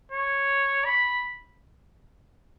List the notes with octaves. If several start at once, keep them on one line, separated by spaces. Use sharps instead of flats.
C#5
B5